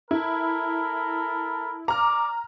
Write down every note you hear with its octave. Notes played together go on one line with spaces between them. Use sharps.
E4 A4 A#4 B5
D5 A#5 D6 F6